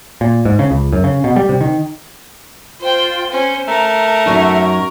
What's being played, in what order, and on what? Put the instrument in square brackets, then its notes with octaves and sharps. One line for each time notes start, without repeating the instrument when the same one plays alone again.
[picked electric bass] A#2
G#2
C#3
C#2
F#2
C#3
B2
G3
C3
D#3
[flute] F4 [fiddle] C5 G5
[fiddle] C#4 C5
[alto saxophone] A3 [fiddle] A#4 [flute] A#5
[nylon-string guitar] F#2 F#3 D#4 [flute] C#6